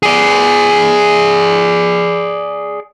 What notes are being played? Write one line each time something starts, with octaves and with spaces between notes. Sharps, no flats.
G#4 D5